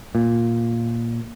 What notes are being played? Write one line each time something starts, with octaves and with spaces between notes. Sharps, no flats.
A#2